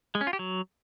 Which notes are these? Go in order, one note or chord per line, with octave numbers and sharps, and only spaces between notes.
G#3
C#4
F4
G4
F#3